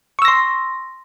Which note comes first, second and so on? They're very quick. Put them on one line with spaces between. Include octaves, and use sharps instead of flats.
C#6 E6 A#6 C6